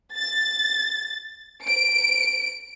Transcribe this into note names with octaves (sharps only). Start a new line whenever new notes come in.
A6
D7